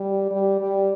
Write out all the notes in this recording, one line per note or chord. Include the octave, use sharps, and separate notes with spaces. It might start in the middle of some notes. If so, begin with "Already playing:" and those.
Already playing: G3
G3
G3